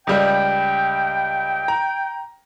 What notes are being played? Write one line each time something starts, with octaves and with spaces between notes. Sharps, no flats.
C#2 G3 G5
A#5